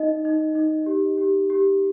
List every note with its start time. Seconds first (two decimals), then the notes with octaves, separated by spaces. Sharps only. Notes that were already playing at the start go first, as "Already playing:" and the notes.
Already playing: D#4 D#5
0.25 D#4
0.55 D#4
0.86 G4
1.17 G4
1.50 G4